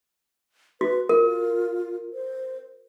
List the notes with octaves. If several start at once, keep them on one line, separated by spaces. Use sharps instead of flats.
F#4 B4
F4 A#4
C5